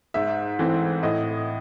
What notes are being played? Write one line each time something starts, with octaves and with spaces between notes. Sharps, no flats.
G#2 E5
E3 A3 C4
A2 D#5